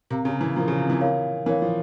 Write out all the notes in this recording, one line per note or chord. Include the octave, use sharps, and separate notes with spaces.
C3 A#4 F5 A#5
C#3
E3
F3 A#4 F5 A#5
C#3
C3
E3
A#4 C#5 F5
E3 A#4 C#5 F5
F3